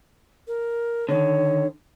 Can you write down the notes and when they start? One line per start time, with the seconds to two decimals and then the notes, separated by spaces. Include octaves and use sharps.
0.47 A#4
1.09 D3 D#3 C#5